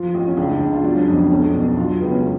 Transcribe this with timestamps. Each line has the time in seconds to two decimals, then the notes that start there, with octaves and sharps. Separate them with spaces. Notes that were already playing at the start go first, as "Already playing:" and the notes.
Already playing: F3 F4
0.14 A1
0.27 C#4
0.37 C#2 D4
0.60 C#2
0.73 F4
0.83 F#3 D4
0.96 C#4
1.07 F2 D4
1.19 D4
1.30 B1 C#4
1.53 B2 D4
1.77 F#3 F4
2.00 C#2 B3
2.12 C#4